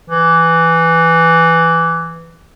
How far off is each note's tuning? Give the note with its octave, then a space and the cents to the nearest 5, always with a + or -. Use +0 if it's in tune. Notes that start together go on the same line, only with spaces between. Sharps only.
E3 +10